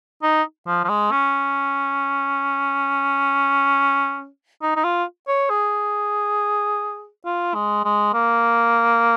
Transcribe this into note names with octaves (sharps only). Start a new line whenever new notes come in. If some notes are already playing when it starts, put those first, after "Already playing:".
D#4
F3
F3
G#3
C#4
D#4
D#4
F4
C#5
G#4
F4
G#3
G#3
A#3